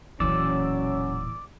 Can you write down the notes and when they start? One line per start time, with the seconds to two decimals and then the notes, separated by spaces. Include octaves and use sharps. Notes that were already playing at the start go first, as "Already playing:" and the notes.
0.20 E1 A#2 E3 F#3 C#4 D5 E6